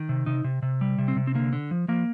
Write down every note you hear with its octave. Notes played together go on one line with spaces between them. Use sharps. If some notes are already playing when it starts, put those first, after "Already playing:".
Already playing: D#3
C3
C3 D#4
C3
C3
G3
C3
C4
C3
C4
D3 A#3
D3
F3
F3 A#3